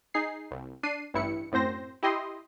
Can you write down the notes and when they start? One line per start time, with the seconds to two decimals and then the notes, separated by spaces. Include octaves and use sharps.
0.14 D#4 G#4 C7
0.51 C2
0.83 D4 C7 D#7
1.14 A1 G2 E4 C#7
1.52 F#2 A2 C4 C5 A#6
2.03 E4 G4 D#5 C6